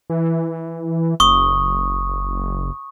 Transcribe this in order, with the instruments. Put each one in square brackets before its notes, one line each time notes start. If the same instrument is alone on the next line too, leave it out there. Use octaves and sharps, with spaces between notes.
[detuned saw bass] E3
[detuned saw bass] F#1 [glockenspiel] C#6 D#6